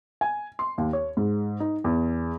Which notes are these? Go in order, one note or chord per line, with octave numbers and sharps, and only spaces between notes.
G#5
C6
D#2
C#5
G#2
D#4
E2